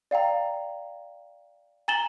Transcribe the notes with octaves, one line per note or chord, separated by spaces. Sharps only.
D5 F5 G5 A#5
G#5 A#5 A6 E7 F#7 G7